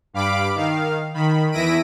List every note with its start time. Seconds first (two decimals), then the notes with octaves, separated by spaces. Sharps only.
0.14 G2 F5 B5 D6 D7
0.55 D#3 F5
1.14 D#3 B5
1.51 E2 E4 A#6 B6 D7 D#7